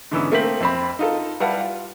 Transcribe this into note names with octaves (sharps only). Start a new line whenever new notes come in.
G#2 D3 E3 B3 C#4 E6
A3 A#3 C4 B6 F#7
F2 C4 B5
D#4 F4 A4
G3 E4 B4 F5 F#5 A5
F4